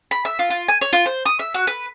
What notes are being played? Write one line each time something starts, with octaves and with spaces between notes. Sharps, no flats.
B5
E5
F4
F4
G#5
C#5
F4
C5
D#6
E5
F#4
B4